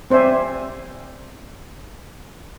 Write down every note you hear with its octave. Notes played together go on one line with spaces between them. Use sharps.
C4 C5 D5 E5 G#5